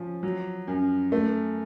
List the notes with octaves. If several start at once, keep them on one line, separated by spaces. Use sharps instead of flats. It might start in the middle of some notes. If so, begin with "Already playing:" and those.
Already playing: F3 C#4
F#3
F#2
A3